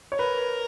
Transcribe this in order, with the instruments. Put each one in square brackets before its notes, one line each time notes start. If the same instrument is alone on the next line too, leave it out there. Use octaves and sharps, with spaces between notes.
[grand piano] C#5
[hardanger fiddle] A#4 [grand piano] B4